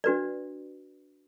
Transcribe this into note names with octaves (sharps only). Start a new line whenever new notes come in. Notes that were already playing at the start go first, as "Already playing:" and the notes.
D4 F#4 B4 D5